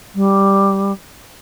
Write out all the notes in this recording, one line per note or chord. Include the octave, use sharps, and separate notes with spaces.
G3